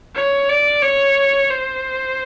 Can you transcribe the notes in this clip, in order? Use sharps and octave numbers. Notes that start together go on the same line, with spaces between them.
C#5
D5
C#5
C5